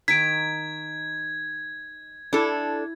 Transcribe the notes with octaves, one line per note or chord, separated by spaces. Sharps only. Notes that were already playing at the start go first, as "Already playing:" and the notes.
D#3 D#4 G#6 B6 D7
D4 E4 A4